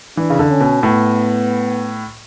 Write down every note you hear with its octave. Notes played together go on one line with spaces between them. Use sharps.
E3 D4
C#3
D3
C#4
B2
A2 B3